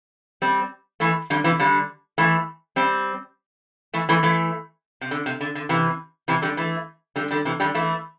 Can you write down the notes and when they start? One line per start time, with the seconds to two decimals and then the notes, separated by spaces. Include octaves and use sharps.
0.42 G3 C4
1.00 E3 A3
1.30 D3 G3
1.44 C3 E3
1.59 D3 G3
2.18 E3 A3
2.76 G3 C4
3.94 E3 A3
4.09 E3 A3
4.23 E3 A3
5.01 C3
5.11 D3
5.26 C3
5.41 D3
5.55 D3
5.69 C3 E3
6.28 C3 E3
6.42 D3 G3
6.57 E3 A3
7.16 D3 G3
7.31 D3 G3
7.45 C3 E3
7.60 D3 G3
7.75 E3 A3